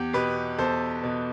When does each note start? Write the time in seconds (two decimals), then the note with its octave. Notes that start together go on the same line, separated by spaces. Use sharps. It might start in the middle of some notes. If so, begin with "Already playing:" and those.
Already playing: E2 G4
0.13 B2 G4 B4
0.59 E2 A4 C5
1.03 B2